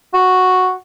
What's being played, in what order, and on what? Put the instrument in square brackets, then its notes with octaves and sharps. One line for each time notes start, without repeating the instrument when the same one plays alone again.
[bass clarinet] F#4